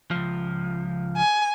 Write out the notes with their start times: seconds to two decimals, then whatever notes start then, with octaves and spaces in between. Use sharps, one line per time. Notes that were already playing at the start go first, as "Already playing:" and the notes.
0.11 C#2 F3
1.17 G#5